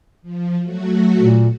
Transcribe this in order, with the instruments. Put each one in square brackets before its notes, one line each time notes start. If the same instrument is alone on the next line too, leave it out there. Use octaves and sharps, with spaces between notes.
[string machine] F3
F#3 A3 F#4
[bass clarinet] A#2